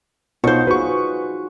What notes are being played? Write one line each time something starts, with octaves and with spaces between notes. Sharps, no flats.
B2 D#4 F4 C5 C#5
F#4 G#4 B4 C#6